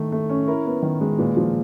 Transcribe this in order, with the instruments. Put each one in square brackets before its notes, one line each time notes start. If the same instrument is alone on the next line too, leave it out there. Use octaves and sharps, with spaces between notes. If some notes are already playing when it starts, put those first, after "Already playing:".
Already playing: [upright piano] D#3 A3
A3
C#4
E4 A#4
B3
D#3
G#3
A#2 B4
F3